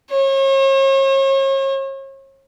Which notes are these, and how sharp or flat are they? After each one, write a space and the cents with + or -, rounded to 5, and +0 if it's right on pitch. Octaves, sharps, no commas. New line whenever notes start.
C#5 -40